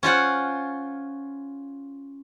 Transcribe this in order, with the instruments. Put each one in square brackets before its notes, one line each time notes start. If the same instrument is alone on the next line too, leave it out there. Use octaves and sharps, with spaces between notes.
[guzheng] C#4 F4 C5 F#5